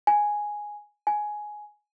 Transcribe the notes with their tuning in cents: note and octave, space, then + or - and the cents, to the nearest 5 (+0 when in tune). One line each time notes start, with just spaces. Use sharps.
G#5 +0
G#5 +10